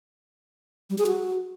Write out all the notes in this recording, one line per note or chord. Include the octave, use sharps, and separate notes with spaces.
G3
G#4
F#4